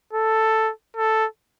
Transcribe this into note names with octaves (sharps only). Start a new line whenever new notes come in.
A4
A4